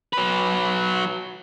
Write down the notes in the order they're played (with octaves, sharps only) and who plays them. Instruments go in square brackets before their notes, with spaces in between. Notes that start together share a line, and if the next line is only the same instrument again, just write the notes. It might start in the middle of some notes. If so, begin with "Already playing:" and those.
[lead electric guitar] F#3 B4